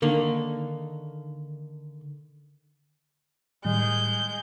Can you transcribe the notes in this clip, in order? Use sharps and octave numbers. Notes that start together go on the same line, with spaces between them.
D3 D#3 A#3
A2 D#3 G3 G#3 G6